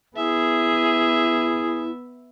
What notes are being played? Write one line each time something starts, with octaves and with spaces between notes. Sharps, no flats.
B3 E4 G#4 E5